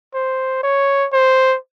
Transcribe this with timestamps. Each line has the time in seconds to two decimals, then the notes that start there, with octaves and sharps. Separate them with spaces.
0.14 C5
0.63 C#5
1.13 C5